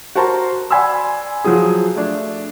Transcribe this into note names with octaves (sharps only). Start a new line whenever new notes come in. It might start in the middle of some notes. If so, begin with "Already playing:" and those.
F#4 A#4 C5 A5 A#5 C6
D5 F#5 G#5 B5 C6 E6
F3 F#3 G#4
A3 D4